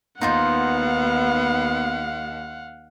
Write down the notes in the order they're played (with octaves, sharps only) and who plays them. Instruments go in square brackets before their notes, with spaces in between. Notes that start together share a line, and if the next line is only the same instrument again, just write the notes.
[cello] D#2 [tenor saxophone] B3 [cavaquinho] D#4 F4 C5 [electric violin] F5 F#5